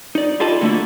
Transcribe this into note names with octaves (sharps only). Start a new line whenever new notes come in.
D#4 D5
E4 F4 G4 A4 D5 D#5
D3 A3 A#3 E4 F#4